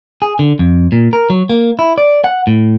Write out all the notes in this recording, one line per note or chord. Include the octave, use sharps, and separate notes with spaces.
G#4
D3
F2
A#2
A#4
F#3
A#3
E4
D5
F#5
A2